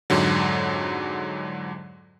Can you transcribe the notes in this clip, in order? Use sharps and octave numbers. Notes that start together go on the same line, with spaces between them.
F2 G#2 D3 F#3